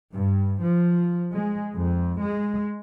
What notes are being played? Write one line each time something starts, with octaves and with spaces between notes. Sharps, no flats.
G2
F3
G#3
F2
G#3